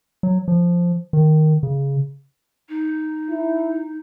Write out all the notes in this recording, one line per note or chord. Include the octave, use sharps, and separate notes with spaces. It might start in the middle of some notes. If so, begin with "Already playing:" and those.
F#3
F3
D#3
C#3
D#4
E4